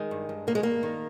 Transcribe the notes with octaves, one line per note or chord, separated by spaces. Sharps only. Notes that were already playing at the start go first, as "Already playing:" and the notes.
Already playing: D#3 G#3
G2
G2
D#3 A#3
G#3
G2 A#3
D#3